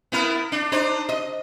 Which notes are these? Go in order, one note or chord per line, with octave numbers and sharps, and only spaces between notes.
B3 E4 A#4
D4
D4 D#4 C5
D#5